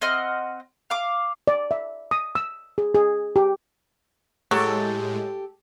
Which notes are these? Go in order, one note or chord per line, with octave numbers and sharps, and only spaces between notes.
C4 D#5 F#5 F6
F5 D6
D5
E5
D#6
E6
G#4
G#4
G4
A2 F#3 G#3 G4 A4